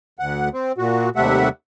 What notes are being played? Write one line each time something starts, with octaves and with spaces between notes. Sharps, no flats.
D2 F#5
C4
A#2 F#4
D#2 C3 G3 A3 E5 F#5